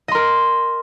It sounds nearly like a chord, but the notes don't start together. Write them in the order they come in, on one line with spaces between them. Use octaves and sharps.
D#5 C6 A#4